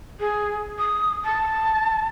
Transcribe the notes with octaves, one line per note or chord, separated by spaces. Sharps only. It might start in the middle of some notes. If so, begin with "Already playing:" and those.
G#4
D#6
A5